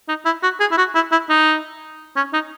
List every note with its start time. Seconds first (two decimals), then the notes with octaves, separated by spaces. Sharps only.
0.08 D#4
0.26 E4
0.43 F#4
0.60 G#4
0.72 E4
0.78 F#4
0.95 E4
1.12 E4
1.29 D#4
2.17 C#4
2.33 D#4